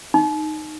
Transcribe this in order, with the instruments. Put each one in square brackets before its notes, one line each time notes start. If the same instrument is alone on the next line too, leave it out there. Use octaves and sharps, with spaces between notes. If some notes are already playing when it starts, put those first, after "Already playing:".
[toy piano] D#4